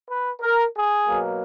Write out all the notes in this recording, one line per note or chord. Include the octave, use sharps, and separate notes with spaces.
B4
A#4
G#4
B2 F#3 A#3